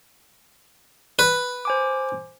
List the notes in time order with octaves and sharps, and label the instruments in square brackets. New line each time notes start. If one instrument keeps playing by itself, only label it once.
[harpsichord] B4
[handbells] C5 G#5 D6